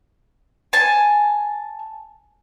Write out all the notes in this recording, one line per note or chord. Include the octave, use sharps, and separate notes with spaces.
G#5 A5